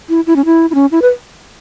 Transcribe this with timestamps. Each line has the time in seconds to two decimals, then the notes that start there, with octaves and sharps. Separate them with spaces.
0.09 E4
0.27 E4
0.36 C#4
0.45 E4
0.70 E4
0.75 C#4
0.91 E4
1.02 B4